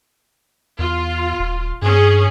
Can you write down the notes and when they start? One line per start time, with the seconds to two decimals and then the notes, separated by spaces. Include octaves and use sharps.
0.79 E2 F4
1.39 D#1
1.82 G2 C#4 G#4